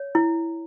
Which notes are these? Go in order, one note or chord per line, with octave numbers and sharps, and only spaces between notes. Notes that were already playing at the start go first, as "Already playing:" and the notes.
Already playing: C#5
E4